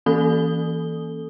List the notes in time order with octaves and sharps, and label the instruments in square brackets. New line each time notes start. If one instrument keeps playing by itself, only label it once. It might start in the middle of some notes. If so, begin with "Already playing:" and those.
[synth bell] E3 A#3 C#4 A4 D#6 G7